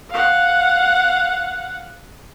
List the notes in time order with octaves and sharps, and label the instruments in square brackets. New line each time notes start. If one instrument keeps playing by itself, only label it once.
[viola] F5 F#5